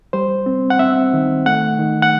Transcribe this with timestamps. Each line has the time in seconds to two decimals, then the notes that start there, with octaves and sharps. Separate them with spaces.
0.13 G3 C5
0.46 C4
0.70 F#5
0.79 C4 E5
1.13 D#3
1.46 A3 F#5
1.79 D#3
2.02 F#5